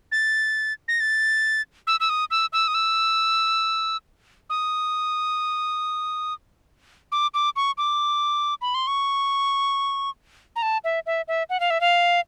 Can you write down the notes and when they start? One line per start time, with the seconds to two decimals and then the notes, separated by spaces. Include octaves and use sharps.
0.12 A6
0.88 A#6
1.00 A6
1.87 E6
2.00 E6
2.09 D#6
2.31 E6
2.53 E6
2.68 D#6
2.74 E6
4.50 D#6
7.12 D6
7.34 D6
7.56 C#6
7.78 D6
8.61 B5
8.75 C6
8.87 C#6
10.56 A#5
10.62 A5
10.84 E5
11.06 E5
11.28 E5
11.50 F#5
11.60 F5
11.70 E5
11.81 F5